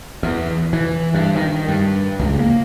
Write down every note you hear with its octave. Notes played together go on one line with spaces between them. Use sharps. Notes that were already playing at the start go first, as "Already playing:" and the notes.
E2
E3
G2
D#3
G2
C#2
A#3